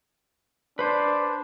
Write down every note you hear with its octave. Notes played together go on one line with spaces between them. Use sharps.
D4 B4 C5